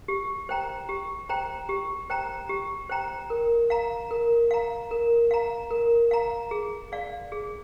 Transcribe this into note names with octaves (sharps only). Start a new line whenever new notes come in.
G4
C5 G5 A#5
G4
C5 G5 A#5
G4
C5 G5 A#5
G4
C5 G5 A#5
A#4
F5 A#5
A#4
F5 A#5
A#4
F5 A#5
A#4
F5 A#5
G#4
D5 F5
G#4